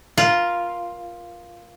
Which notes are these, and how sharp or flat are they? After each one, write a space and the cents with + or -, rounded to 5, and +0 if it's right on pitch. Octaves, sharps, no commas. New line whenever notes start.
F4 +0 A#4 +25